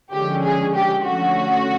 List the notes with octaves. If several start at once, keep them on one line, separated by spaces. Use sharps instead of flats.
D3 F3 G#3 C#4 G4
G#4
G4
D3 F3 A3 C#4 F#4